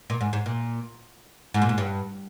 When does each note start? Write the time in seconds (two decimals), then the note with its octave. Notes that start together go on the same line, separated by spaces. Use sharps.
0.10 A#2
0.21 G#2
0.33 G#2
0.46 A#2
1.54 G#2
1.62 A#2
1.69 G#2
1.78 G2